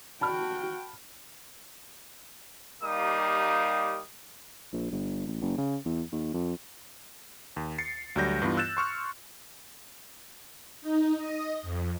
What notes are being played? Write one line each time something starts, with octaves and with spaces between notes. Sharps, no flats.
F#4 G5 A5 B5 F6
G3 A#3 D#4 G4 F5 D#6
A#1
G1
A1
F#1
C#3
E2
D#2
F2
D#2
A6 C7 C#7
D2 F#3 G3 G6 A#6
G2 E3 B3 F4
E6 F#6 G6 A6 E7
C6 C#6 F6 C#7
D#4
D#5
F2